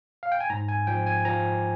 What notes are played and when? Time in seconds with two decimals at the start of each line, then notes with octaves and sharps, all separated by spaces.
0.23 F5
0.32 G5
0.40 G#5
0.50 G#2 A#5
0.68 G#5
0.87 F3 G5
1.07 G#5
1.25 F3 A#5